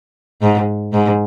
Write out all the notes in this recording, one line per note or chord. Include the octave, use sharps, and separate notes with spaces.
G#2
G#2